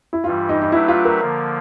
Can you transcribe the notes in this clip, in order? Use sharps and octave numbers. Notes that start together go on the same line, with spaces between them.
E4
G2 E3 G3 F4
D#4
D#4
F#3 A3 D4 E4 G4 B4
F4
A#4
D3 F3 A#3